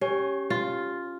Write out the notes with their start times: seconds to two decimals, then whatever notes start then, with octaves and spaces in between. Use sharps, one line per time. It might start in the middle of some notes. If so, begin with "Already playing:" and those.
0.01 C#4 G4 C#5
0.50 F4